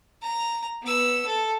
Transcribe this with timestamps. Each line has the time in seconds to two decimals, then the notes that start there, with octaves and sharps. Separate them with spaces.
0.22 A#5
0.82 B3 E6
1.26 A4